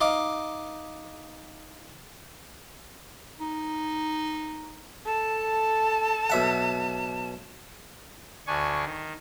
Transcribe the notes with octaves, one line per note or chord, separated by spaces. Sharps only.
D#4 F5 D6
D#4
A4 A5
B1 E5 F#5
D2 D4 G#5 C#6
D#3